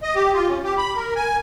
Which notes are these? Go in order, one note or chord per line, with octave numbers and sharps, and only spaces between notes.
D#5
G4
F4
C#4
G4
B5
A#4
G#5